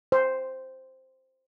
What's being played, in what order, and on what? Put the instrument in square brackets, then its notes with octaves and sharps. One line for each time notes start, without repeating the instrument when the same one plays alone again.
[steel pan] C5